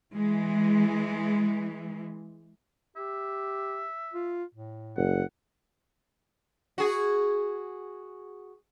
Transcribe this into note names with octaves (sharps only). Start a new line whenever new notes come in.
E3 G#3
G4 E5
F4
A2
F#1 F#5
F#4 G#4